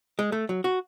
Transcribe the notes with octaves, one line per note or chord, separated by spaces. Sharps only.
G#3
A3
F#3
F#4